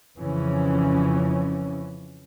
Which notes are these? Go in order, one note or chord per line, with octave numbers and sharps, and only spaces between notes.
F2 C#3 E3 C#4